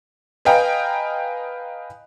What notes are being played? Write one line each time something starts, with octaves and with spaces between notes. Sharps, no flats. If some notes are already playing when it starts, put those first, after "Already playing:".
B4 D#5 F5 G5 G#5 A#5